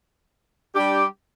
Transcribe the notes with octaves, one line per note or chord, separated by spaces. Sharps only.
G3 D4 G4